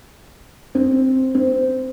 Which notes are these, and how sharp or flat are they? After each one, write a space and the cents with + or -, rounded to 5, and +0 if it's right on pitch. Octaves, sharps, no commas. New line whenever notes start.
C4 +5
C4 -15